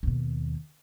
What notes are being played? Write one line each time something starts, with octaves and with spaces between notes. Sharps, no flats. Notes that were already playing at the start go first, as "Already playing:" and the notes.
D#2 B2